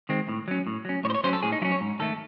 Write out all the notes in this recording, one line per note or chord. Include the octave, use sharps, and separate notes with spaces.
D#3 G#3 C4
A2
F#3 C#4
A2
F#3 C#4
A2 C#5
C5
C#5
F#3 C#4 C5
A4
A2 G#4
D#4
F#3 C#4 E4
C#5
G#2
D#3 A3 A4